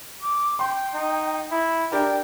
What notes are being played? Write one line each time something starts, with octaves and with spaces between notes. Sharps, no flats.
D6
G5 C6
D#4
E4
D4 G4 A#4 G5